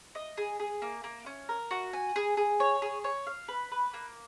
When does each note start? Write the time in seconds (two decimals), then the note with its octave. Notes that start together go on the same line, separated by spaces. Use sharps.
0.15 D#5
0.38 G#4
0.60 G#4
0.82 A#3
1.04 A#3
1.26 C#4
1.49 A#4
1.71 F#4
1.93 G#5
2.16 G#4
2.37 G#4
2.60 C#5
2.82 G#4
3.04 C#5
3.27 F5
3.48 B4
3.72 B4
3.94 A#3